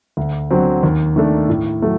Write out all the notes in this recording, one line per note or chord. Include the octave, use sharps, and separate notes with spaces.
D2
D3 F#3 C4
D#2
D#3 A3 D4 A4
A2
F#3 A3